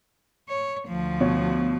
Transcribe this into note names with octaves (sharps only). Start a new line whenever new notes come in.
C#5
D2 F3
B2 C#5